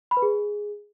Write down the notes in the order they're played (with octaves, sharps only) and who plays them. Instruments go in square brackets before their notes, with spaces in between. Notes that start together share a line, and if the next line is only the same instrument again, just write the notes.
[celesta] B5
B4
G#4